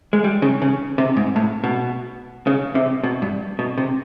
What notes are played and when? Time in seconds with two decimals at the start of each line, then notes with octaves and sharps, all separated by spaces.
0.13 G#3
0.24 G3
0.42 C#3
0.62 C#3
0.98 C3
1.17 G#2
1.36 A2
1.64 B2
2.47 C#3
2.75 C3
3.04 B2
3.22 G2
3.59 B2
3.78 C3